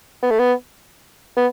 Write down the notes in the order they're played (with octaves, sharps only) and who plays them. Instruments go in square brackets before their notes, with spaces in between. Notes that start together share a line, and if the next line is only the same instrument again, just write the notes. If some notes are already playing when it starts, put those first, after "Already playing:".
[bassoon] B3
A3
B3
B3